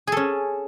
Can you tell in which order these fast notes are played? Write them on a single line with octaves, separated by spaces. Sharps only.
G#4 A4 C#4